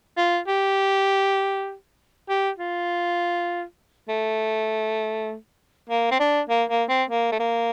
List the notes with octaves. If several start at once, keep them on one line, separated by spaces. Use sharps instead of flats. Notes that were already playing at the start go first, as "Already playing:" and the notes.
F4
G4
G4
F4
A3
A#3
C4
D4
A#3
A#3
C4
A#3
A3
A#3